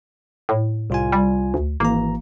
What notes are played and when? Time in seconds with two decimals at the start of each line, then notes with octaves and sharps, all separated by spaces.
0.49 A2
0.90 C2 F4 G#5
1.12 G3
1.54 D2
1.80 G#1 E3 A#3 A#5